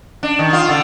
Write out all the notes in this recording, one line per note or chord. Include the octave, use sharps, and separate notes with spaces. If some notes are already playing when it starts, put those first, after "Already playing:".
D4
D#3
F4
D3